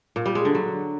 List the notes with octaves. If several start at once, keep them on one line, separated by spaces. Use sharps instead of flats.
A#2
G3
G#3
D3
F#3